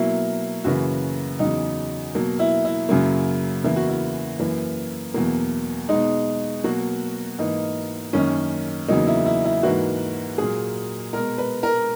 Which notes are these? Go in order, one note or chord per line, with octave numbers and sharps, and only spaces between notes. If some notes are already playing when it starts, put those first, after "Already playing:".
Already playing: B2 F#3 A#3 E4
F#2 C#3 E3 A#3 F#4
E2 C#3 F#3 D#4
B2 F#3 A#3
E4
E4
F#2 C#3 F#3 A#3
E2 C#3 E3 A#3 E4
F#4
E4
F#2 E3 A#3
E2 B2 F#3 A#3
G#3 D#4
B2
B2 F#3 A#3 F#4
G#2 E3 A#3 D#4
F#2 D#3 A#3 C#4
E2 C#3 F#3 A#3 D#4
E4
E4
E4
G#2 E3 A#3 F#4
A#2 F#3 A#3 G#4
B2 G#3 A#4
B4
A#4